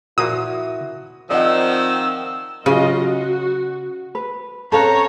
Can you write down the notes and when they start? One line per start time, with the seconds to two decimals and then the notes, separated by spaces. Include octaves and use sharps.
0.18 A#2 F3 A#3 E4 F#4 D#6
1.30 D#3 F3 C4 D5 D#5 F#5 E6
2.66 C#3 F#3 F4 D#5
3.10 F#4
4.15 B4
4.72 C4 C#4 A4 B4 C#5 F5 A#5